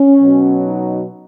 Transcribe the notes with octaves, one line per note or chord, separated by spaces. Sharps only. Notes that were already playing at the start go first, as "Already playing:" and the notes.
Already playing: C#4
B2 F#3
D#4